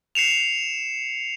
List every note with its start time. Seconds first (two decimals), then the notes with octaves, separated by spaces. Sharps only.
0.15 C7 C#7 E7 F7